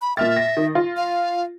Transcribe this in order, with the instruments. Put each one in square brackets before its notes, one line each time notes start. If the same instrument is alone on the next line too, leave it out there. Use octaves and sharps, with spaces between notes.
[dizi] B5
[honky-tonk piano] A#2 F6 A6 [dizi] E5
[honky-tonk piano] A#6
D#3
F4
[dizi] F5